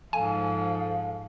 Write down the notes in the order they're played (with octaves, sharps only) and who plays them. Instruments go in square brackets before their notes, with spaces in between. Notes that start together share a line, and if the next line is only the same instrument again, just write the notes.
[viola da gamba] G#2 F3 [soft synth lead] A4 [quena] F5 [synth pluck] G#5